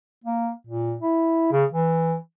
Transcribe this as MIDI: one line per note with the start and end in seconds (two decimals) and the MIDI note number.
0.24 0.50 58
0.67 0.96 46
1.02 1.51 64
1.52 1.64 49
1.72 2.16 52